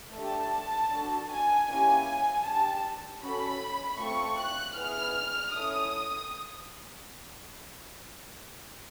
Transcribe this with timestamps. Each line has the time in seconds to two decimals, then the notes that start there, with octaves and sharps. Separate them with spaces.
0.14 A3 D4 G4 A5
0.91 D4 F#4 A4
1.30 G#5
1.68 A#3 C#4 E4 G4 G#5
2.44 D4 G4 A5
3.21 C#4 F#4 A4 B5
3.99 A3 C4 F4 A4 C#6
4.37 F#6
4.76 B3 E4 G#4 F6
5.52 C#4 E4 A4 D#6